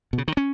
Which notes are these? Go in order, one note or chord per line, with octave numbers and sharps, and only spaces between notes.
B2
C#3
D#3
C#4